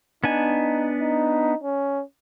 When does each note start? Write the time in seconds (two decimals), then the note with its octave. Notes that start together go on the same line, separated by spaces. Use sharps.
0.24 B3 D4 D#4 G#5
1.01 D#4
1.63 C#4